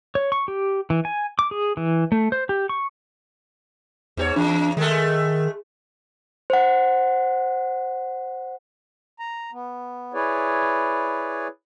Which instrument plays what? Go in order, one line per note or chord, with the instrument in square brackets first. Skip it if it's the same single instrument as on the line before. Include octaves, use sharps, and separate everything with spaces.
[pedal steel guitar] C#5
C#6
G4
E3
G#5
D6
G#4
E3
A3
C5
G4
C#6
[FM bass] E2 [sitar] G#2 G4 C#5
[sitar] E2 [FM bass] D4
[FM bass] D#3 [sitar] G#3 A3
[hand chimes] C5 F#5
[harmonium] A#5
B3
E4 G#4 B4 C#5 D5